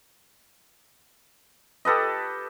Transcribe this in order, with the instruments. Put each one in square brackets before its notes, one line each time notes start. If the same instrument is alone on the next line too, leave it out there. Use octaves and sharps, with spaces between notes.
[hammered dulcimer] G4 A4 B4 D#5